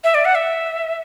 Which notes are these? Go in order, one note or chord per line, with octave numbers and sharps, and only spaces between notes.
E5
D5
F#5
E5